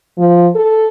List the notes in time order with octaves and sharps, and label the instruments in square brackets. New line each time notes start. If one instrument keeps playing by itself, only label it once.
[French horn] F3
A4